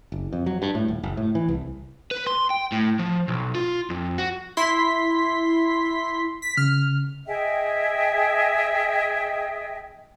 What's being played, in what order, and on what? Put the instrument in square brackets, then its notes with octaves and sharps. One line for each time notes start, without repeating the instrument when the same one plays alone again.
[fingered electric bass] F#1
F2
F#3
G2
A2
D#1
F#1
A2
E3
C2
[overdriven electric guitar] B4
C6
G5
A2
F3
B1
F4
F2
F#4
[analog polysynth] E4 C6 B6
B6
[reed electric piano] C#3 [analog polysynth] F6
[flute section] G#4 D#5 E5 G5